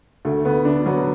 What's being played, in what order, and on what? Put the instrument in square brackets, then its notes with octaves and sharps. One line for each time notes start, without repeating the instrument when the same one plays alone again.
[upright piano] D2 A3
D2 B3
D3 D4
F#3 B3